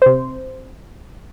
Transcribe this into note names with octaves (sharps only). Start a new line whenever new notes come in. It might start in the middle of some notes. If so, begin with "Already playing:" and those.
C3 C5